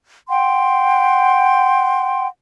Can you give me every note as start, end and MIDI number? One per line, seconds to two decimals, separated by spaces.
0.30 2.26 78
0.30 2.26 79
0.30 2.26 84